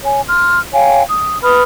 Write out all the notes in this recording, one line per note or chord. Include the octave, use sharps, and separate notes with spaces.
C#5 G#5
C6 F6
C#5 F5 G5 G#5
D#6
B4 B5 D#6 F6